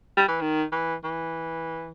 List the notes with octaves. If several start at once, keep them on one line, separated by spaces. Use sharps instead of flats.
G3
E3
D#3
E3
E3